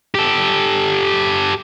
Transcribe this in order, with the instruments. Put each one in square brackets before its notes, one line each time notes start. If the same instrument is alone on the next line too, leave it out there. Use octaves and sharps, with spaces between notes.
[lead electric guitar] G4 A4